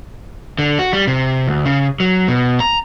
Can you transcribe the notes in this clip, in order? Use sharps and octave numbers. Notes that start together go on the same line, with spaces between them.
D3
F#4
G3
C3
D2
C#3
F#3
B2
A#5